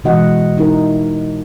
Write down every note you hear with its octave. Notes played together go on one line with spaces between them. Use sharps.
B2 E3 G#3 F#4 D#5 F#5
D#4 E4 A#4